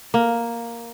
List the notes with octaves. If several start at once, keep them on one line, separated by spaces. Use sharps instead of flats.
A#3